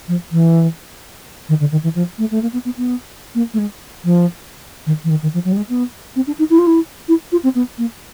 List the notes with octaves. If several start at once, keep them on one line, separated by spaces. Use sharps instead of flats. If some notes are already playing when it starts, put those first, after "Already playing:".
F3
E3
D#3
D3
D#3
E3
F3
A3
A3
A#3
B3
B3
B3
A#3
A3
G#3
F3
D#3
E3
D#3
D#3
F3
F#3
G3
G#3
B3
C4
D4
D#4
E4
F4
E4
E4
F4
C4
B3
A#3